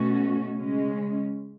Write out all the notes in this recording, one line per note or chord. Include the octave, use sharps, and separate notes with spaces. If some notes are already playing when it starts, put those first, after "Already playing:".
Already playing: B2 A3 C#4 F#4
C#3 G#3 C#4